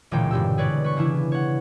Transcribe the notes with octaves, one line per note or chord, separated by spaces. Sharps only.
E1 C#2 A#2 D3 E3 G5
E1 G2 G4 E6
G#4 B4 C#5 D5
B4 C#6
C#3 E3 D4 E4
C#5 F#5